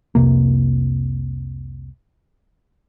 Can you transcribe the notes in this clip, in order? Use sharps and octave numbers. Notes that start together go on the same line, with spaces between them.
C2 F2 C3 A#3